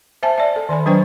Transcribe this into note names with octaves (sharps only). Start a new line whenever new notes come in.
C5 E5 G#5 A5
D5 E5
A4
D#3 D5 G#5 B5
F#3 D4 B4 C5 G5 C#6